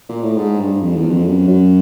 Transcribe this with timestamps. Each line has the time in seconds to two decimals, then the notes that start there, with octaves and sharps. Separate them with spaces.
0.09 A#2
0.22 A2
0.37 G#2
0.59 G2
0.81 F2
0.96 E2
1.11 F2
1.26 F#2
1.48 F#2